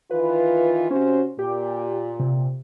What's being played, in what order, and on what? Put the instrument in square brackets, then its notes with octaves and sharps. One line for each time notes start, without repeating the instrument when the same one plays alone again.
[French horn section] D#3 E3 F4 [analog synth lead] B4
[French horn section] C3 F#4 C5 [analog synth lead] C#4
[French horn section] A#2 [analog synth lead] G4
[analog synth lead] C3